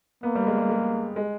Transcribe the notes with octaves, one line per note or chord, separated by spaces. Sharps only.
A#3 B3
G3
G#3
G3
G#3
G#3